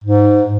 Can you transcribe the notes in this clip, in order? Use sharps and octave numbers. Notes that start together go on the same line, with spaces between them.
G#2